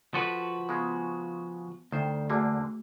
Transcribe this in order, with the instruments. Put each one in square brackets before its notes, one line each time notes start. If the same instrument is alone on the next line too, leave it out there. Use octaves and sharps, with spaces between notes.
[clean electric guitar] F3 F#4 B4 [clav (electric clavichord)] A4
[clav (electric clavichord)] C#3 G#3 [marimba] B3
[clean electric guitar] D2 [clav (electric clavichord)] D#3 C5 [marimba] E5 G5
[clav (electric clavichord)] E2 D3 A#3 [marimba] A3 F#4 G#4